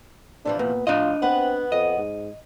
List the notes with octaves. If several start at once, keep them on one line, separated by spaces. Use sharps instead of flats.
C3 E3 F3 D4
A#2 B3
A2 F3 D4 F4 D#5
B3 C4 B4 F#5
F2 D#5
G#2